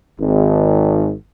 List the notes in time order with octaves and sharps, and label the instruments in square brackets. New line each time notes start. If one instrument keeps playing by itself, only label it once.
[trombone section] G#1